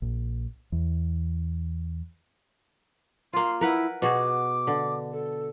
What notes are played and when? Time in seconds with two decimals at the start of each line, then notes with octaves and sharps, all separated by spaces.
0.02 A#1
0.72 E2
3.33 A#3 F4 C6
3.61 E4 A#4 B4 F#5
4.02 B2 F#4 G#4 D6
4.67 D3
5.12 A4